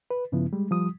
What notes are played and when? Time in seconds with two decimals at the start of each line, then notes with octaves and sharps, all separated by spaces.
0.11 B4
0.32 G2 C#3 F3 B3 E4
0.53 G3 G#3
0.71 F3 G3 D#6